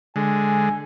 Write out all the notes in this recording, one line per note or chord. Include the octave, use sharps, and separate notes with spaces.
D3 G#3 G#5